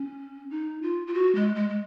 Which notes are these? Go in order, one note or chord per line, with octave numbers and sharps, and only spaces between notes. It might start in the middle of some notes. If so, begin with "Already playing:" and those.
Already playing: C#4
D#4
F4
F4
F#4
G#3
G#3
G#3